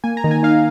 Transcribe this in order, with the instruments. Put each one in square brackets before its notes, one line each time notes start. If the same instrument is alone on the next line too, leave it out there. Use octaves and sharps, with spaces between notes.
[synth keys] A#3 G#5
A#5
D#3
G#5
D#4 F5